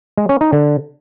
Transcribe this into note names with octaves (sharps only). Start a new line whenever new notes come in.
G#3
C#4
D#4
D3